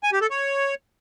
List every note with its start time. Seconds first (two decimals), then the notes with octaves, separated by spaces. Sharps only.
0.03 G#5
0.12 G4
0.21 A4
0.30 C#5